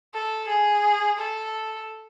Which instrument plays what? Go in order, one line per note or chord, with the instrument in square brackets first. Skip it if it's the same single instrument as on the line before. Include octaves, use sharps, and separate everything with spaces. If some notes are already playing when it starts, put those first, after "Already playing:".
[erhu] A4
G#4
A4